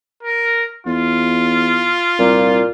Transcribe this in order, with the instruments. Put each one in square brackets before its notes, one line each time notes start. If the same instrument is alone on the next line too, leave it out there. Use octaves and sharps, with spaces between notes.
[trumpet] A#4
[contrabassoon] E2 [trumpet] F4
[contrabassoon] C2 [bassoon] A#2